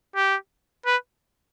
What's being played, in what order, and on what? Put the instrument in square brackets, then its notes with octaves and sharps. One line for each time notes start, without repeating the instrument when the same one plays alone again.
[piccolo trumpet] G4
B4